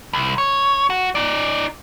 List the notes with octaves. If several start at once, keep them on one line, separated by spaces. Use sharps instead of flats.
C2
C#5
F#4
D#4 D5